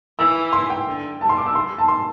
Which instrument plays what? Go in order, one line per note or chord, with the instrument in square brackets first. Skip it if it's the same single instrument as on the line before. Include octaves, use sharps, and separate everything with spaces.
[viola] E3 [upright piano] E6
[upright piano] C6
G5
[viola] D3
[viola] G3 [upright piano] A5
[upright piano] C6
D6
E6
C6
A5
C6